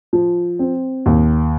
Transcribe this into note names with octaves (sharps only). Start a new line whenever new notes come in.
F3
C4
D#2